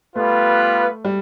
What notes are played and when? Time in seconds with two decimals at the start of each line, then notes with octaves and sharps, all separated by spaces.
0.16 G3 A3 B3 F4 B4
1.05 G3